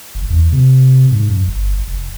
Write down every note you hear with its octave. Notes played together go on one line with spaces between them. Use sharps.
F#1
E2
C3
G#2
F#2
G1
F1